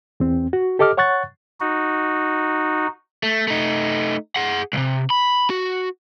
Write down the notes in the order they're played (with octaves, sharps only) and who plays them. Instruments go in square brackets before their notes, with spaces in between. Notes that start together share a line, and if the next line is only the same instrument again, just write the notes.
[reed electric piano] E2 C4
F#4
G4 A4 D#5 D6 F6
C#5 F#5 C#6 F#6 A6
[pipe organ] D#4 F#4
[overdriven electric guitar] A3
A3 D#4
G#4 F#5
C2 C3
B5
F#4